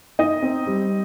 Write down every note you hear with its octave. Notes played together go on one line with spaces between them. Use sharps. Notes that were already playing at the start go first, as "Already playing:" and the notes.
D#4 D#5
C4
G3